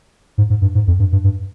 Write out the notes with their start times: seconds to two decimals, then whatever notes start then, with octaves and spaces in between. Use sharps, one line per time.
0.38 G#2
0.50 G#2
0.62 G2
0.75 G#2
0.87 F2
0.99 G2
1.12 G2
1.24 G2